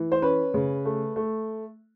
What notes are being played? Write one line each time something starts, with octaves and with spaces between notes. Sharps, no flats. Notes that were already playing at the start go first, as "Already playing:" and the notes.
Already playing: E3
C5
C#4 B4
C#3
A3
A3